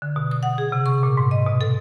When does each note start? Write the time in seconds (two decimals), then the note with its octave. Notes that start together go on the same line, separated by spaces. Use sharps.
0.02 D3
0.16 B2
0.31 D#6
0.43 F#5
0.58 G#4
0.72 C3
0.86 C#6
1.03 A#2
1.17 G#2
1.31 D#5
1.46 B2
1.61 A4